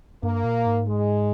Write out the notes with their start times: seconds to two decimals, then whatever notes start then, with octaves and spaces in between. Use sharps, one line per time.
0.23 G2 A#3
0.44 A#2
0.66 G#2
0.87 G#3